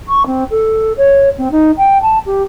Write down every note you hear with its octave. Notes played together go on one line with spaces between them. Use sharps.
C#6
C4
A4
C#5
C4
D#4
G5
A5
G4